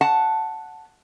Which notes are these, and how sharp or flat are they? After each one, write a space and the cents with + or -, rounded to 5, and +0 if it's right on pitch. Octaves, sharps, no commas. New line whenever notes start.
F#5 -5 A5 +0